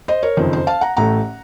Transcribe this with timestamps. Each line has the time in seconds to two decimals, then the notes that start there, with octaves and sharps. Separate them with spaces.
0.08 C5 D#5
0.23 A#4 C#5
0.37 F#1 F2 D#3 C5
0.53 C5
0.67 F5 A5
0.81 F#5 A#5
0.97 A1 A2 A3 F#5 A#5